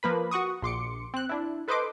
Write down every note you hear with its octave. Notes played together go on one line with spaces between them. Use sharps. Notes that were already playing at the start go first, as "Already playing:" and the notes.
F3 A#3 B4 B5
F#4 F#5 C#6 D#6
A#1 C6 D6 C#7
C4 F#6
D4 E4
A4 B4 C5 D#5 C6 D6